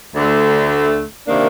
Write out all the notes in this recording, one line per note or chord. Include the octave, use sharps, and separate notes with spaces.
D2 D3 A3
C3 D#3 A#3 D4